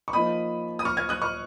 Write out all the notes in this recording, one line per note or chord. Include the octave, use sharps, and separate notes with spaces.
C#6
F3 A#3 D#4 B5 D#6
D#6
C#6 F6
F6 G#6
D#6 F#6
C#6 F6